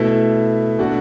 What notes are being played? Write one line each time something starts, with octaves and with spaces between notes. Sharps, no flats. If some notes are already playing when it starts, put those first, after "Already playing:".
Already playing: B2 A3 E4
B2 A3 D4 F#4